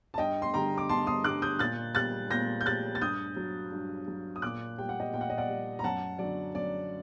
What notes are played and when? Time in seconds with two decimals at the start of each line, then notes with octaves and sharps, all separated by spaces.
0.14 A5
0.18 G2 D#5 G5
0.42 C6
0.53 D3 G3 G5 A#5
0.78 D6
0.89 G2 A5 C6
1.07 C6 D#6
1.24 D3 G3 D6 F#6
1.42 D#6 G6
1.59 A#2 F#6 A6
1.95 G3 F#6 A6
2.30 A#2 G6 A#6
2.61 G6
2.66 G3 F#6 A6
2.95 A6
3.01 G2 D#6 G6
3.36 F#3
3.72 G2
4.08 F#3
4.36 D#6
4.42 A#2 D6 F#6
4.78 G3 G5
4.89 F#5
5.00 D#5 G5
5.14 A#2 G5
5.21 F#5
5.30 D#5
5.38 D5 F#5
5.49 G3
5.79 A#5
5.84 F#2 F#5 A5
6.19 D3 F#3 D5
6.55 F#2 D5